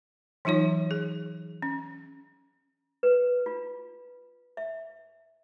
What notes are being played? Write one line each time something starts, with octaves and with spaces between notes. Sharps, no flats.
E3 F#3 D#4 F4 C#5
G#4
C#4
B4
F4
E5